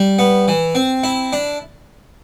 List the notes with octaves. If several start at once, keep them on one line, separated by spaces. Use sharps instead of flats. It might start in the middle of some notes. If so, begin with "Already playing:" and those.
Already playing: G3
B3
E3
C4
E4
D4